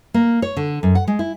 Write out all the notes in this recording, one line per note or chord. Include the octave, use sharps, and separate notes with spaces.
A#3
C#5
D3
F#2
F#5
G#3
E4